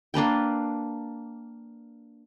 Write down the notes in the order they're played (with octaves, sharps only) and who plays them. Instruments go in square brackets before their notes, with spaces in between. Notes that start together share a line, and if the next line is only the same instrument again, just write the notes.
[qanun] A#3 D4 B4 G5